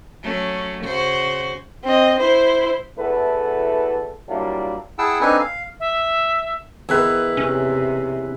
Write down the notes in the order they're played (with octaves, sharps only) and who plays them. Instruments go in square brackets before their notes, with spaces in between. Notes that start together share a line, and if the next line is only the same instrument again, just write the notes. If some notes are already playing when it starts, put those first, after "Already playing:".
[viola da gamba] F#3 A3 C#4
C#3 F#4 C5
[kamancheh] C4 D#5
E4 C5
[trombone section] E2 A3 E4 F#4 A4 B4
F#3 G3 A#3 D4 E4 F4
[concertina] E4 G#4 F#5 G5 A5 E6
C4 D4 D#4 A4 B4 G#5
F5
[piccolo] E5
[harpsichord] E2 D#3 [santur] E4 B4
[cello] C3 [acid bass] C#4